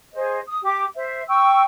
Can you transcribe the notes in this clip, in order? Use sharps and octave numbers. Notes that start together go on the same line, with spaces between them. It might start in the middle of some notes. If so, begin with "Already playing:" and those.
G#4 C5 D#5
D#6
G4 D6
C5 E5
G5 C#6 E6